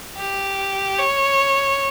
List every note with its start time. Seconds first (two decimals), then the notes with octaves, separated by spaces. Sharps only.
0.17 G4
0.99 C#5